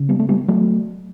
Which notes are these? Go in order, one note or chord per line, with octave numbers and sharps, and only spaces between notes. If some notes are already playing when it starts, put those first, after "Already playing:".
Already playing: C#3
G3 B3
A3
G3 B3
F#3 A3